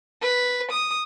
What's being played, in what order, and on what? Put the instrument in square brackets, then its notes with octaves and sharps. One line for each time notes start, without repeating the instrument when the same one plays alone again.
[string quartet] B4
D#6